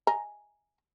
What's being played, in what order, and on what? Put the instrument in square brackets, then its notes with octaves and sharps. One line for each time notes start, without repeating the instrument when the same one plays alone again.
[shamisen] D#5 G#5 A#5